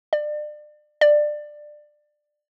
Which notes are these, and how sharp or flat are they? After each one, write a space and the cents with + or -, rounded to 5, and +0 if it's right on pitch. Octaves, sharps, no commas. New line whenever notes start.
D5 +35
D5 +20